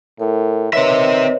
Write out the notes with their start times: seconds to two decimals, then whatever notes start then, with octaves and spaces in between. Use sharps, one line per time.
0.20 A2 A#4
0.73 D#3 C4 B4 C#5 D#5 E5